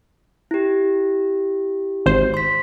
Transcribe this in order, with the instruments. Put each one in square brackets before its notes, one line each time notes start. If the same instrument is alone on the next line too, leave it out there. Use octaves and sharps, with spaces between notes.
[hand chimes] E4 G4
[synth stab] G#1 C5
[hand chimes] C6 B6